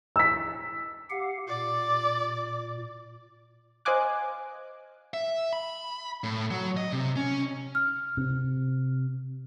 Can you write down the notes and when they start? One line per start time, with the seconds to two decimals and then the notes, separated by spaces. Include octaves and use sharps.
0.16 E6 B6
1.10 G4 F5 F#5
1.48 A#2 D5
3.85 C5 D#5 F5 G#5 D6 F#6
5.14 E5
5.53 B5
6.24 A2
6.51 F#3
6.77 D#5
6.93 C3
7.16 C#4
7.75 F6
8.17 C3